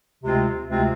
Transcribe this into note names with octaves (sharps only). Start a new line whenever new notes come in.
D2 C3 G#3 C4 F4
D2 C3 G#3 C4 F4